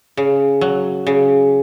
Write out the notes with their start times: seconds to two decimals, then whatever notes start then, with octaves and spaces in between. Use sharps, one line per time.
0.17 C#3
0.61 F#3
1.07 C#3